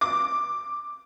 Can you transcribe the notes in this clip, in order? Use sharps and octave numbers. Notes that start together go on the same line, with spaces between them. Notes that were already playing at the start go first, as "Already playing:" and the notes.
D6